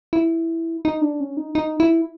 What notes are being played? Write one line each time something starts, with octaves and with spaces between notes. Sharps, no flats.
E4
D#4
D4
C#4
D#4
D#4
E4